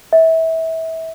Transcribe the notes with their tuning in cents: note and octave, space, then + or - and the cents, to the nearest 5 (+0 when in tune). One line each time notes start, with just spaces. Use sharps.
E5 -25